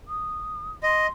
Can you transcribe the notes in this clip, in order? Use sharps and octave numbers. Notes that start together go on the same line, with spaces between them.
D#6
D#5 C6